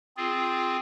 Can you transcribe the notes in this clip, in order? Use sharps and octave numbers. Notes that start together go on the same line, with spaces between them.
C4 F4 G#4